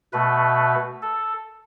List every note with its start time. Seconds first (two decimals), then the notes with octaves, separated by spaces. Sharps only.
0.13 B2 A3 B4
1.02 A4